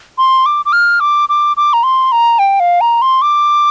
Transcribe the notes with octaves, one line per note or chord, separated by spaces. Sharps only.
C6
D6
D6
F6
D6
D6
D6
A#5
C6
A#5
G5
F5
A#5
C6
D6